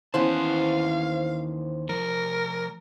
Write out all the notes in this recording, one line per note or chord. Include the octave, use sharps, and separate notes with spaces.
D#2 E3 B3 C#4 C5 F5 A5
F3 A3 A#4